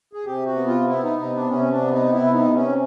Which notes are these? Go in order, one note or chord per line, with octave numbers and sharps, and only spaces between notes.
G#4
C3 G4
F#4
B3
F4
B3 E4
D#4
C3 D#4
D4
C3 C#4
D4
B3
D#4
C3 E4
D#4
C3
C#4